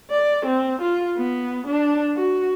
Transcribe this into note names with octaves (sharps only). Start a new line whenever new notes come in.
D5
C4
F4
B3
D4
F#4